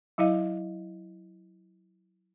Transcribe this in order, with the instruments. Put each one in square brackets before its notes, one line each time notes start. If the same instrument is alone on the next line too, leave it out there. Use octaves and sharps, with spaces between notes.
[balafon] F#3 E4 D#5 F5